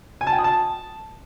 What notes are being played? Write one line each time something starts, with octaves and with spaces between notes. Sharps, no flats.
G#5
A5
G5
D#6
A5